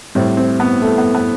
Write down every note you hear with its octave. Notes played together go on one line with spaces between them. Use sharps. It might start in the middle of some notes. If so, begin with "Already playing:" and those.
A2 G3 C4
C4
B3
A3
B3
B3